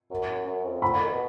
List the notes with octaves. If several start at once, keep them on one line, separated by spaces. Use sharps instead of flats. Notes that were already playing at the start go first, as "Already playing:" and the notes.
F#2
F#2
F2
B5
D3
D#3
B2